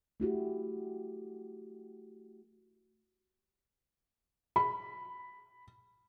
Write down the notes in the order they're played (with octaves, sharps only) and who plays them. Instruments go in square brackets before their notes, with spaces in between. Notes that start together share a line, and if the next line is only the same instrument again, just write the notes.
[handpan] A3 E4 F#4 G4
[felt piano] B5